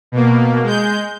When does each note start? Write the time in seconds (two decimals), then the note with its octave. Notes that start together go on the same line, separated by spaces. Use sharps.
0.12 B2 A#3
0.63 G#3 G6